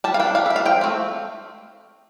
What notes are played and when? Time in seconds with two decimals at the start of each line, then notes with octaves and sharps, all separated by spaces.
0.04 G3 A5
0.14 F5
0.20 D4 G5
0.35 G3 F5
0.46 D4 E5
0.56 F5
0.65 F3 G5
0.81 A3 C4